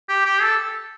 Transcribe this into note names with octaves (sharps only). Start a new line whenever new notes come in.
G4
G4
A4